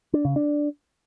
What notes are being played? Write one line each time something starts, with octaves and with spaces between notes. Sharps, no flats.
D4
C#3
D4